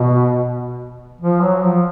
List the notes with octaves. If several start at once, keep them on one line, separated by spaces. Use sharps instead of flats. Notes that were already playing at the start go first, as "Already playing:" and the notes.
Already playing: B2
F3
F#3
F3